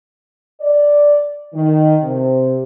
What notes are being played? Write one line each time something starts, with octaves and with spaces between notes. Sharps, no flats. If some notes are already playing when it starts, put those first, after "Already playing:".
D5
D#3
C3